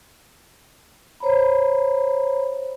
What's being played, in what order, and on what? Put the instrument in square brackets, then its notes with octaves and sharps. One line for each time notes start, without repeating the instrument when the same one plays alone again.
[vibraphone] C5 C#5 A#5 B5